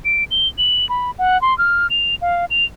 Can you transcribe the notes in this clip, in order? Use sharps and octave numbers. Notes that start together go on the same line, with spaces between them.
D7
G7
F#7
B5
F#5
C6
F6
F7
F5
F7